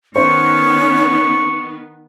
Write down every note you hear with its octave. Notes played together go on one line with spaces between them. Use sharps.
D#3 B3 C#4 C5 C#6